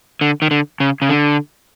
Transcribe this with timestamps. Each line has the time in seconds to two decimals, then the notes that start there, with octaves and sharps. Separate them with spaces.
0.21 D3
0.42 D#3
0.51 D3
0.80 C#3
1.02 C#3
1.10 D3